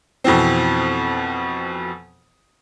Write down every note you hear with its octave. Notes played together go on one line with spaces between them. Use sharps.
F2 B2 E3 C4